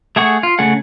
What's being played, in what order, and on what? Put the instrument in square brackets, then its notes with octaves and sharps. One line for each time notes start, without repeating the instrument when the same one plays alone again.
[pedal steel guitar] A3 G#4 F#5 C#6
F4
C#3 A3 G#4 F#5